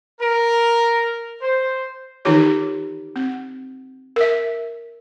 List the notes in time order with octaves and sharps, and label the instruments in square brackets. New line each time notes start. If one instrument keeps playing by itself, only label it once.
[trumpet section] A#4
C5
[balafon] D#3 E3 D#4 F4 G4 C#5
C4
A#4 E5